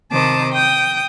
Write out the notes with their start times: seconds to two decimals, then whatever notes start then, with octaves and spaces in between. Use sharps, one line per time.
0.11 C3 D#3 C5 A5 D6 D#6
0.52 G5 D#6 G6